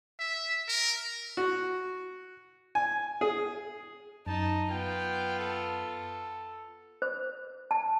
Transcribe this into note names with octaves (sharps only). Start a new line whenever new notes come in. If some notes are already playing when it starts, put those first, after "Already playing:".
E5
A#4
F#4
G#5
G#4
F#2 D#4 A5
B3 F4 G5
A4
C5
A5